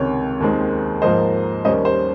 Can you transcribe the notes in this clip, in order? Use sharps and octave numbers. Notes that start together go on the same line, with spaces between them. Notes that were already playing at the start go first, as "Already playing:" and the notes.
Already playing: C#2 C3 D#3 C#5
D#2 D#3 G#3 C4
G#2 F3 A#3 C5 D#5
D#2 D#3 G3 C#4 C5 D#5
C5